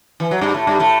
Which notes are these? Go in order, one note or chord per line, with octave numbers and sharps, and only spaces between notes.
E3
F#3
G2 G3
A2 A3
G2 G3
A2 A3